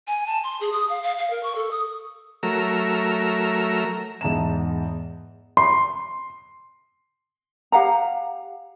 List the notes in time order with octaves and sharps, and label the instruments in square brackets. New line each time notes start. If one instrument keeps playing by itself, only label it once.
[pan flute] G#5
A5
C6
G#4
D#6
F5
F5
F5
A#4
C#6
A4
D#6
[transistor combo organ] F#3 A3 A#4 A#5 E6
[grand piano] E2 G#2 E5 A5 A#5 E7
C6
[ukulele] G4 F5 F#5 A#5